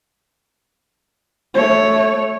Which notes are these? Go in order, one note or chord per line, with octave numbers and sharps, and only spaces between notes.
A3 C#5